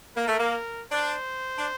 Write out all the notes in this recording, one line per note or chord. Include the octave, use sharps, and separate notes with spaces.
A#3 A#4
A3
A#3
D4 C5
D4